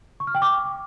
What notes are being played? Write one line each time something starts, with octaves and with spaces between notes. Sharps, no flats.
C#6
F6
G5
D6